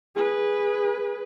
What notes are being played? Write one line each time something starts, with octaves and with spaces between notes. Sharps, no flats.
G#4 B4